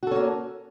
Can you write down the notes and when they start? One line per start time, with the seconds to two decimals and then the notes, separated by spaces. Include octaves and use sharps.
0.03 F#4
0.07 A4
0.11 C#4
0.16 A#3